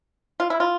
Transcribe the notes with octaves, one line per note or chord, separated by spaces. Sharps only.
F4
E4
F4